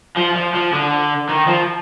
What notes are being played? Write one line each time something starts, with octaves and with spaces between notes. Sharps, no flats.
F3
F3
F3
D3
D#3
F3